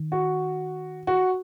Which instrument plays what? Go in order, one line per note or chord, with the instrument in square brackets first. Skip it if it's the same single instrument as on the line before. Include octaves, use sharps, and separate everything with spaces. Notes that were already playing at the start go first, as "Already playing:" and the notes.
Already playing: [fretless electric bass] D#3
[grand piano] F#4
F#4